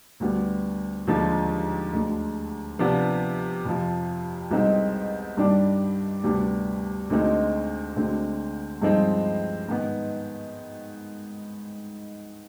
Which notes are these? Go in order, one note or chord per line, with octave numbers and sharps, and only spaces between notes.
D2 D3 G3 B3
D#2 D3 F3 G#3
D2 D3 G#3
C3 F3 B3 D4
F2 C3 F3
C2 B2 G#3 C4 D#4
G2 D#3 G3 D4
D2 C3 G3 B3 D4
D2 D3 G#3 C4 D#4
D2 D3 G#3 C4
G2 F3 G#3 C4 D#4
G#2 D#3 B3 D#4